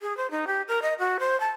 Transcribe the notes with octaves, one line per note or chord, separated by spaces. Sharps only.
G#4
C5
D#4
G4
A#4
D#5
F#4
C5
A5